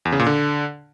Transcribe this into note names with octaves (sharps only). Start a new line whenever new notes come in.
E2
C#3
A#2
D3